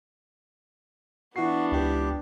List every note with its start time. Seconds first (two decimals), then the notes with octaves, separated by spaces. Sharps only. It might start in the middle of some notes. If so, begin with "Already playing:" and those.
1.36 E3 B3 D4 F#4 C7
1.72 C#2 G4